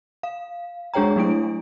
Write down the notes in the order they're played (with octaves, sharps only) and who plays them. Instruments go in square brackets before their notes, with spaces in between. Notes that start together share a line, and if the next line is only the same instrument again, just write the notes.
[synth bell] F5
G#3 D4 G#4 C#5 G5 A#5
F#3 A3 D4 E4 D7